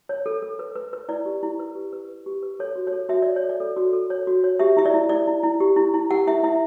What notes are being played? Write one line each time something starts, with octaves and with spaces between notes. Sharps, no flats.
C#5
A4
A4
B4
B4
B4
E4 D5
G4
E4
B4
G4
B4
B4
G4
B4
A4 C#5
F#4
C#5
A4
F#4 E5
C#5 D5
C#5
A4
D5
A4
F#4
A4
C#5
F#4
C#5
G4 E5
E4 E5
D5
E4
E4 D5
E4
E4
G4
E4
E4
G4 F#5
E4 E5
E4 E5